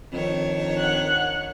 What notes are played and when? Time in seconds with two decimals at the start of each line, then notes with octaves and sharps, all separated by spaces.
0.13 F2 D#3 D4 C#5
0.79 F#5 F#6